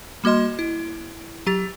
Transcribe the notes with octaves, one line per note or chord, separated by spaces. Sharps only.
G3 A#3 F#4 D#5 C6
E4
F#3 G4 A6